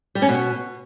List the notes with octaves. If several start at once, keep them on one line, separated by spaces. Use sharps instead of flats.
G3
C#4
B2